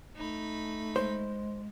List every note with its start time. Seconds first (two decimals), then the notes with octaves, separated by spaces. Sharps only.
0.16 A3 D#4 B5
0.96 G#3 C5